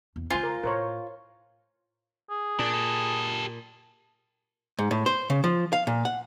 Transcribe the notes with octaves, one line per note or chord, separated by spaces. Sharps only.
E2
C#3 G#3 F4 C5 G#5 C6
A#4
A2 A#4 C5 C#5
G#4
A#2 D4
G4 A4
G#2
A2
C5
C#3
F3
F5
A#2
F#5